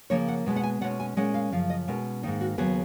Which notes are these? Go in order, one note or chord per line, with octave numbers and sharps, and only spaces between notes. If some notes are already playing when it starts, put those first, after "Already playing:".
C#3 F3 A#3 C#5
F#5
B2 G#3 B3
F#5
G#5
B2 G#3 C#4 F#5
G#5
A#2 G#3 C#4 F#5
F5
F#2 C#3 F3 F5
D#5
B2 G#3 C#4 A#4
G#2 D#3 A#3 D#4
F#4
D#2 C#3 F#3 B3 G#4